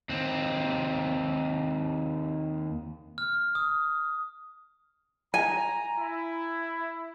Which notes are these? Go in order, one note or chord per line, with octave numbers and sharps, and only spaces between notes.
D#2 C4
F6
D#6
G#5 A#5
E4